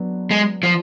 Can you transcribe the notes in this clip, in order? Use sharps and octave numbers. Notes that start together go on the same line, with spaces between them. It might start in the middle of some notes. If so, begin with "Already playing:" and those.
Already playing: F#3 B3 D4
G#3
F3